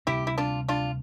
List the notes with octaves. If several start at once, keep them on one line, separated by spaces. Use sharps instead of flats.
D2 C3 G3 C4 E4 G4
E4
D4 F4
D4 F4